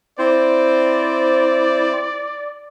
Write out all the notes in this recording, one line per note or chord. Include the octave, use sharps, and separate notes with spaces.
C4 E4 C5 D5